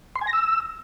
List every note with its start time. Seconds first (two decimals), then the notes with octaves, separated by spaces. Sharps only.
0.16 C6
0.21 G#5
0.27 A#6
0.33 E6